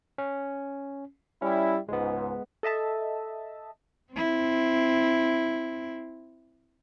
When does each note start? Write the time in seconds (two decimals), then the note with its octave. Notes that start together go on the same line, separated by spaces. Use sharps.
0.18 C#4
1.42 G3 C#4 E4
1.89 C#2 G#2 G#3 B3
2.63 A4 D#5 E5 A5
4.13 C4 E4